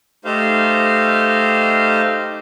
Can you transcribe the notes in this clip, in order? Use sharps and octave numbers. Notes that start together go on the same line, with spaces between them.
A3 D#4 G4 C5 F5